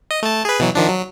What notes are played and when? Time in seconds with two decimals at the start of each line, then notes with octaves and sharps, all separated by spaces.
0.11 D#5
0.23 A3 A5
0.45 G#4 B4
0.59 B2 E3 F#3
0.75 D#3 F3 D4
0.89 F#3